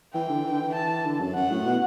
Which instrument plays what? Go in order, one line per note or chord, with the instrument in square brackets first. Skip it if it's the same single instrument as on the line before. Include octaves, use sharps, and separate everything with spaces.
[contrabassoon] E3 [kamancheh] G5
[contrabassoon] D3
E3
D3
E3
[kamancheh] A5
[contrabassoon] D3
F#2
[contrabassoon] F#2 [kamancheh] F#5
[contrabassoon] A2
B2